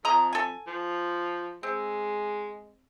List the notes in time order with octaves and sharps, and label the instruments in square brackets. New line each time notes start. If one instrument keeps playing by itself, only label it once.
[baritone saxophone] F2 [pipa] D#5 A#5
[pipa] A4 G#5
[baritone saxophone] F3
[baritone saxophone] G#3 [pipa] C4